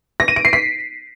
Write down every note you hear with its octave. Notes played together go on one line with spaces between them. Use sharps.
A#6
D#7
D7
C7
B6